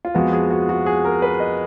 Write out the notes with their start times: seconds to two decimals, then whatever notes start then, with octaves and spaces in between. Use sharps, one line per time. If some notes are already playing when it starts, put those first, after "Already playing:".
0.05 F4
0.14 F2 F3 G#3 B3 F#4
0.33 G#4
0.50 F#4
0.69 F#4
0.86 G#4
1.05 A#4
1.22 B4
1.40 D#5